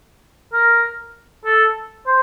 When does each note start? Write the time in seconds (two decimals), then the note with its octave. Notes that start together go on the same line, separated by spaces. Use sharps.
0.53 A#4
1.45 A4
2.07 C5